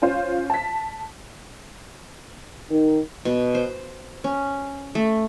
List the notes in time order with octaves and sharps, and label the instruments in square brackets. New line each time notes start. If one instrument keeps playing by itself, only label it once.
[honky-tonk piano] C#4 F4 C5 C#5
A5 B6
[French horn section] D#3
[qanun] B2
C5
C#4
A3